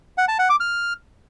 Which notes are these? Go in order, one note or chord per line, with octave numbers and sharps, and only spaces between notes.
F#5
A5
F#5
D6
F6